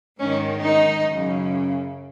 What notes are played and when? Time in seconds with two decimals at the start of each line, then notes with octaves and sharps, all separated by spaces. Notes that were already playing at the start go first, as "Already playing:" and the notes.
0.19 G#2 D#3 C#4
0.62 D#4
1.05 F#2 C#3